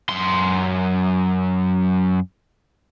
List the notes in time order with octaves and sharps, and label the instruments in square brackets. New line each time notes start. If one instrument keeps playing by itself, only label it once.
[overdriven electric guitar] F#2 C6